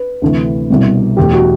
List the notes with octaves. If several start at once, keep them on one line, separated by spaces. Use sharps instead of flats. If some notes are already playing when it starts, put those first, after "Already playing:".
Already playing: B4
D2 C3 E3 A3
C2 B2 G3
E2 B2 A3 G4
F#4